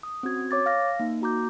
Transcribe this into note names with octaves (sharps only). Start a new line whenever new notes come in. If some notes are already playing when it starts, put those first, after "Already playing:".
D#6
C4 C#4 F#4 G#6
C#5 D6 A6
F5 F6 A#6
A#3 D#4
A#3 F#4 A#5 D6 G6